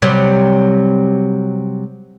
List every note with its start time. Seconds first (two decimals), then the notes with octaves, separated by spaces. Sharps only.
0.02 C3 F#3 G3